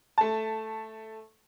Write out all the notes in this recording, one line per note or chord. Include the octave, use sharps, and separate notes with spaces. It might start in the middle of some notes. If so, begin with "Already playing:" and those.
A3 A5